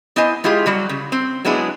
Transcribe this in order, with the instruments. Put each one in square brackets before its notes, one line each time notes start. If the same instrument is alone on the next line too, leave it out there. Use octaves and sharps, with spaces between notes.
[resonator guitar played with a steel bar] B3 E4 C5 D#5 G#5
G#3 E4 F4 G4 G#4
F#3 G3 F#4
C#3
C4
F#3 G#3 B3 D4 E4 G#4